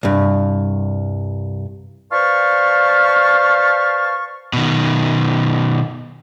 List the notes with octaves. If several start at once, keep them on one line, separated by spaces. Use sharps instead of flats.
C2 G2
B4 C5 D5 F5 A5 C#6
B2 D#3